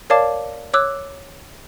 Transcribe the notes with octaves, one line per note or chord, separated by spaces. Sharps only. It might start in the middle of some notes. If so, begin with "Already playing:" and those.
A#4 C#5 D5 F5 A5 D6
C#5 D6 E6 F#6